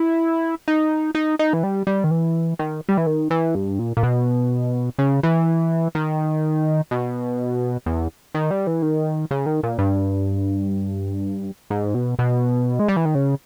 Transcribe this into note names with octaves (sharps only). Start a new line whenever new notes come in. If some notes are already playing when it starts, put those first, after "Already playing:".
Already playing: E4
D#4
D#4
D#4
E3
G3
G3
D#3
E3
D#3
G3
E3
D#3
E3
G2
A#2
A#2
B2
C#3
E3
D#3
B2
E2
D#3
G3
E3
D#3
C#3
D#3
A#2
G2
G#2
B2
B2
G#3
G3
E3
D#3
C#3